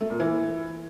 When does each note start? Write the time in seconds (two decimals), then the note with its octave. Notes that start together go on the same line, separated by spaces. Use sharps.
0.01 A3
0.10 A#2
0.20 E3